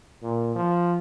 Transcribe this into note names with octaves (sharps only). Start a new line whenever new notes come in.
A#2
F3